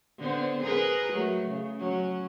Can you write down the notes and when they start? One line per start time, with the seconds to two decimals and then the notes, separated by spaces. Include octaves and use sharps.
0.19 D3 B3 C4
0.61 G#4 A#4 B4
1.13 F#3 A3
1.47 C#3
1.79 F#3 C#4